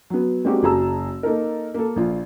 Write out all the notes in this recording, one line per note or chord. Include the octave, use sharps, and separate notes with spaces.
F#3 B3
G#3 A#3 C4 D4 F#4 G4
F#1 F#3 G#4 A5 A#5 E6
A#3 D#4 A4 A#4
A#3 A4
A#1 F4